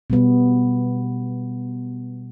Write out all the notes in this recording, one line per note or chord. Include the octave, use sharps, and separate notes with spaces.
B2 G3 B3